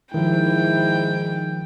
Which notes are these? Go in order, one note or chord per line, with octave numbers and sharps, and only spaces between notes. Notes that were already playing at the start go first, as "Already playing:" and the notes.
G#2 D#3 F3 E4 G5